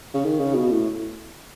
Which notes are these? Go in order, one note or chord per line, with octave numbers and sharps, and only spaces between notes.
C#3
D#3
C#3
B2
A2